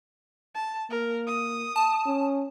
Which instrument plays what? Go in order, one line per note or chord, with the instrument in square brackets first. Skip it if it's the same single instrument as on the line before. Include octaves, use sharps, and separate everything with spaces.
[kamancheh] A5
[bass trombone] A#3 [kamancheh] A#4
[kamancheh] D#6
[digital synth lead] A5
[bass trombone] C#4